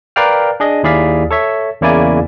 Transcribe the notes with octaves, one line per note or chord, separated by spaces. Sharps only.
A#4 B4 D5 F5 G5 F6
D4 G#4 D#5
D#2 E4 G#4 D5 F5 B6
A4 C#5 E5
E2 C#3 A#3 E4 D5 G#5